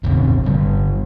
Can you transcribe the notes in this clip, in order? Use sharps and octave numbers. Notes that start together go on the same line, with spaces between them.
E1 A1 C#3 C4
G1 D3 G3